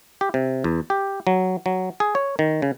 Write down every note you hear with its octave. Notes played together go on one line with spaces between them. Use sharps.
G4
C3
E2
G4
F#3
F#3
G#4
C#5
D#3
C#3